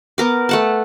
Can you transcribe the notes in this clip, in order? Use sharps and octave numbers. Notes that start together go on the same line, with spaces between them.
B3 A#4 D6
A3 F#5 A5